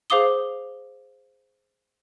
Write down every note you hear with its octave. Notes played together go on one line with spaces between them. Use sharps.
G#4 C5 F5 D6 D#6 G7